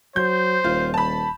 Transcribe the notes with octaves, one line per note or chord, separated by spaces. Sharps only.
F#3 C5 G6
D#1 F4
A5 B5